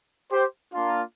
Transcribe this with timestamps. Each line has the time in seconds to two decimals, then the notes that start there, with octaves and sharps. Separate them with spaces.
0.31 G4 C5
0.73 A#3 D4 F4